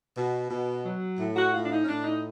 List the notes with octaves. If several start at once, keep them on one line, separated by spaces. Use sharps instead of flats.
B2
B2
F#3
A2
F#4
A2 F4
D4
D#4
C#4
A2 D4
D#4